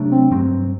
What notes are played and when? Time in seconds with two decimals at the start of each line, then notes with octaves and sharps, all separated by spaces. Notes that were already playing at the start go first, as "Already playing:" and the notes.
Already playing: C3 F#3 A3 D4
0.11 C4
0.31 G2 F#3 C4